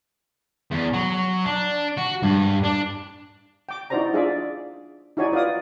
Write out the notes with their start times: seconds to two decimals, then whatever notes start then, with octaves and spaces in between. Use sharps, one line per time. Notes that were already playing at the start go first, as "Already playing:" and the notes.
0.71 E2
0.93 F#3
1.45 D4
1.98 F#4
2.23 G2
2.63 D4
3.69 G5 D6
3.90 D#4 E4 F#4 C5 D5 A#5
4.13 D4 F4 G#4 D5 E5
5.17 D#4 E4 F#4 C#5 D5 G#5
5.32 F4 B4 D5 F5 D#6